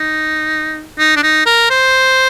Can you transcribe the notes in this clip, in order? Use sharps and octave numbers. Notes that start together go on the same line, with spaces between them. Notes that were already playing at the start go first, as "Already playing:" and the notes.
Already playing: D#4
D#4
D4
D#4
A#4
C5